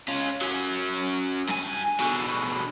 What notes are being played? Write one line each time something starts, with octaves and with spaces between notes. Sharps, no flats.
C#4 F4
F#3 C#4
G2 G#5
B2 D3